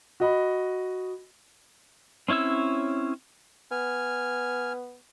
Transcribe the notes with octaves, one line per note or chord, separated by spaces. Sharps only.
F#4 D#5 B5
C4 C#4 E4 C#5 E6
B3 G#5 F6